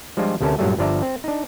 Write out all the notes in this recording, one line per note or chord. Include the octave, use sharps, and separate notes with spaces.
F3 G3 G#3 D4 F4
D2 C3 A3 C#4 A#4 A5
G2 A#2 F#3 G3 A3
G1 F3 D4 D5 E5 A#5
C4
D4 D#4